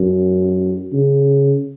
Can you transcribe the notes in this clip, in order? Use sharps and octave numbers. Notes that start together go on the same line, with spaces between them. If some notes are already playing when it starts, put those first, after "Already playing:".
Already playing: F#2
C#3